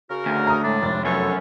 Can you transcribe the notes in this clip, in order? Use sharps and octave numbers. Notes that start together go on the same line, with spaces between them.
C#3 F#4 A#4
D2
A#5 D#6
A2 G#3 D4
F1 A6
F#2 B3 A4 C#5